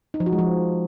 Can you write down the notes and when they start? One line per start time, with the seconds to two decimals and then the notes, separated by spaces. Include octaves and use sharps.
0.14 D#4
0.20 F3
0.26 F#4
0.32 G#3
0.39 F3